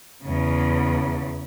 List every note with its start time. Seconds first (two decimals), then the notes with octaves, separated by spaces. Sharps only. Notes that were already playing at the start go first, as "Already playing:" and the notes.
0.23 E2 C#3